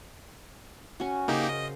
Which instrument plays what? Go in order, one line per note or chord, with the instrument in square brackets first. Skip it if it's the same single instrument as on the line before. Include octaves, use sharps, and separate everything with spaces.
[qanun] C#4 F#4
[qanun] C#3 A#4 C5 [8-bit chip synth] A#3 D#4 G4
[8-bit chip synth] D#5